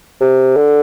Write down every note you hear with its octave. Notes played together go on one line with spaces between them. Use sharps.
C3
D3